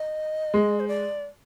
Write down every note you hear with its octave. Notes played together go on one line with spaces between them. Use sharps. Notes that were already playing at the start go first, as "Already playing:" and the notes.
Already playing: D#5
G#3
C5
D5